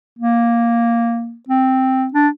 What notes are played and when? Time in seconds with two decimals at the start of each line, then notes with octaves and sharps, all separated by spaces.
0.19 A#3
1.49 C4
2.14 D4